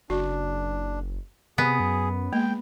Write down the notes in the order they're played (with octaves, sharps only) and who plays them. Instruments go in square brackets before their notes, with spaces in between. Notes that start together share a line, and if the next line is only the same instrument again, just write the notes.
[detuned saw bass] F#1 [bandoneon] D4 [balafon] F#4
[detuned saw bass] C3 [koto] B3 [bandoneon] G#4
[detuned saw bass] F#2
[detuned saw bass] G#3 [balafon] A#3 [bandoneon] G5